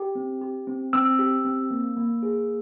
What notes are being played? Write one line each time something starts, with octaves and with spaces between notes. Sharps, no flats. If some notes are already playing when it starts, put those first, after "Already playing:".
Already playing: G4
C4
G4
C4
C4 E6
G4
C4
A#3
A#3
G#4